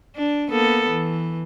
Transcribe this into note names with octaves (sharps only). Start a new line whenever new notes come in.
D4
A#3 B3 A4
E3